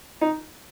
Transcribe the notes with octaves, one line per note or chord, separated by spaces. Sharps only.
D#4